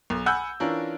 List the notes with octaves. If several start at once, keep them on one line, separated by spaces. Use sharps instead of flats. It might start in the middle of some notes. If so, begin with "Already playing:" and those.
B1
F#5 G#5 B5 E6 F#6 G6
E3 C#4 D4 F4 A#4